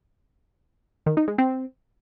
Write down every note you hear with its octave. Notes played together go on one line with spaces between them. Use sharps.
D#3
D#4
G#3
C4